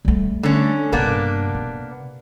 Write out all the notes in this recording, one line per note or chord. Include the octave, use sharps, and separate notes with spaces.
G3 A3
D3 C#4
G2 C3 A#3 B3 D4
C3